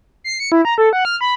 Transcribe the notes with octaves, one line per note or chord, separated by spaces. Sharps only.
C7
C#7
E4
A#5
A4
F#5
F6
B5